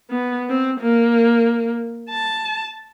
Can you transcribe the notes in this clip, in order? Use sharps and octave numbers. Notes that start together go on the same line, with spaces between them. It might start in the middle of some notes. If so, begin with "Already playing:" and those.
B3
C4
A#3
A5